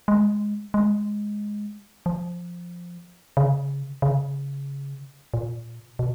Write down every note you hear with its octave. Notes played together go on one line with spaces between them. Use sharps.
G#3
G#3
F3
C#3
C#3
A#2
B2